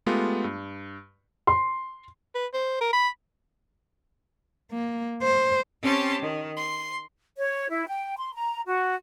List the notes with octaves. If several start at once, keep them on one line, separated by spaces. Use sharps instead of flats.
G#3 A3 B3 F4 G4
G2
C6
B4
C5
A#4
B5
A#3
C5
C4 C#4 G4 C#5 A5 C6
D#3
C6
C#5
E4
G5
C6
A#5
F#4